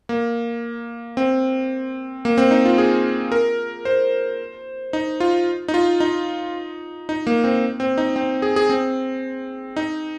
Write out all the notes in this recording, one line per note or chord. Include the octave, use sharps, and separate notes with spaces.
A#3
C4
A#3
C4
D#4
F4
G#4
A#4
C5
D#4
F4
D#4
F4
D#4
D#4
A#3
C4
C4
D#4
C4
G#4
G#4
C4
D#4